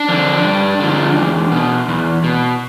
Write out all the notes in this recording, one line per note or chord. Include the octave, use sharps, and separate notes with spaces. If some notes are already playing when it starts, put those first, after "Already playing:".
Already playing: D4 D5
D3 F3
G2
D3 F3
E2
B2
E2
B2